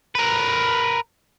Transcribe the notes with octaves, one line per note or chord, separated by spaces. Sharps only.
A#4 B4